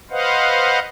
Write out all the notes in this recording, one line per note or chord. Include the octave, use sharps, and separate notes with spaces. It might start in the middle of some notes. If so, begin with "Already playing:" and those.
B4 C5 D#5 F5 F#5